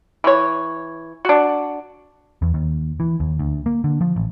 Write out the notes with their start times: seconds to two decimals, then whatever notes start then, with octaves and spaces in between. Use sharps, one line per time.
0.24 E3 C#5
1.25 D4 F#4
2.42 E2
2.54 D#2
3.00 E3
3.20 D#2
3.39 D2
3.66 A#3
3.84 D3
4.01 F3
4.16 A1